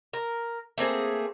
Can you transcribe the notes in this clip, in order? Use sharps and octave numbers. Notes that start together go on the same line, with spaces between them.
A#4
A3 A#3 C4 G#4